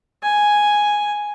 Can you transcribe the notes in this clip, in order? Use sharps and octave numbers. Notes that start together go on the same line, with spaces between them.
G#5